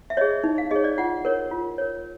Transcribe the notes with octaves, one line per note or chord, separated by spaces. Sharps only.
E5
G#4 C#5 D#5
D#4
F5
G#4 C#5 D#5
D5
F4 F#5
A#4 C#5
F4
A#4 C#5